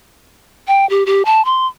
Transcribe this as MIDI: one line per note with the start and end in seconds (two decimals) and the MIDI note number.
0.68 0.88 79
0.90 1.04 67
1.06 1.23 67
1.25 1.44 81
1.45 1.67 84